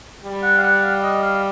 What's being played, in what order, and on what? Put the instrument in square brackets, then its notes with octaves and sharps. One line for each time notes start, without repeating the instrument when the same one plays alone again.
[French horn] G3
[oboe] F#5
F5
F#5
F5
D#5
F5